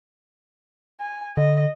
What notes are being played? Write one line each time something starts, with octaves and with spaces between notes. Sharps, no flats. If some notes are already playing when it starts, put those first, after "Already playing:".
G#5
D3 D#5